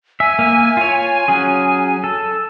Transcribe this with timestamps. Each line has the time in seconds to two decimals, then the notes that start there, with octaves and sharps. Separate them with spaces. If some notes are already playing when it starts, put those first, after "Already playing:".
0.20 E5 G#5
0.39 A#3 E5
0.77 F4 C#5
1.28 F#3 C#4 G#4
2.04 A4